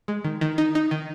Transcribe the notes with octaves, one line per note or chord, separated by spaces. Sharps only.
G#3
D#3
D#3
D#4
D#4
D#3